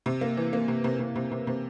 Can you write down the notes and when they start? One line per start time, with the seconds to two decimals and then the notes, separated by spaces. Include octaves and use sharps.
0.06 C3
0.21 A#3
0.37 E3
0.53 A#3
0.68 C3
0.84 C3
1.00 C3
1.16 C3
1.31 C3
1.47 C3